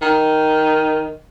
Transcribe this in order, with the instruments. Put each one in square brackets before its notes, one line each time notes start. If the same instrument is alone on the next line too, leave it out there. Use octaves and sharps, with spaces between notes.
[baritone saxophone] D#3